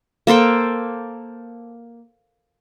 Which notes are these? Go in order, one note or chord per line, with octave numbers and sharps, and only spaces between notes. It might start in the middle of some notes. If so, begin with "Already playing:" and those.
A#3 A4 C5 G5